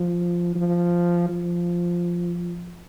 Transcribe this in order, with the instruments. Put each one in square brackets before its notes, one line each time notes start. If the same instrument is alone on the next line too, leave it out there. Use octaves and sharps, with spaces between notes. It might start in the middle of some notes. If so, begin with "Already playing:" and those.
Already playing: [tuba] F3
F3
F3